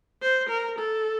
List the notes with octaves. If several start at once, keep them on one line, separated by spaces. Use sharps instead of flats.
C5
A#4
A4